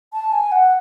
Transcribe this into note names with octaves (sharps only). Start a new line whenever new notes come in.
A5
G#5
F#5